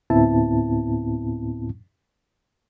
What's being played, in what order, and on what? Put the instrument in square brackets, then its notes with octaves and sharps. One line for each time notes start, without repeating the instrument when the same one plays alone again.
[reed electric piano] D2 A2 B3 C4 E4 A5